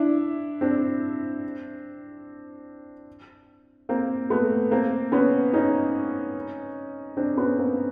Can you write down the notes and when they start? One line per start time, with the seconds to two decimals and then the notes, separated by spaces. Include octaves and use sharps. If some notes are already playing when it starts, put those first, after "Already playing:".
Already playing: D4 E4
0.61 C4 D4
3.89 A#3 C4
4.30 A3 B3
4.71 A#3 C4
5.12 B3 C#4
5.53 C#4 D#4
7.17 C4 D4
7.37 B3 C#4
7.59 A#3 C4